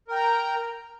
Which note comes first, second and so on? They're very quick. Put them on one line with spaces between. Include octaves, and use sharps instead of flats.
A#4 G5 A#5